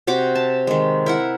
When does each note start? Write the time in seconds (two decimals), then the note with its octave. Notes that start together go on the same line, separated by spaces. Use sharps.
0.07 C3 F#4 C5 D6
0.35 A5
0.67 D#3 G#3
1.06 E4 A#4 F#5